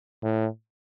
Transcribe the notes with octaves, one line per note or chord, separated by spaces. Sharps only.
A2